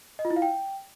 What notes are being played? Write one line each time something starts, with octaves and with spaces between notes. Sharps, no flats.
D#5
F4
E4
F5
G5